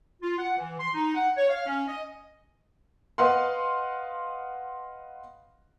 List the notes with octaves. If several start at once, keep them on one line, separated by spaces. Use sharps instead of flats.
F4
F#5
E3
C6
D#4
F#5
C#5
F5
C#4
D#5
B4 D#5 F5 F#5 C6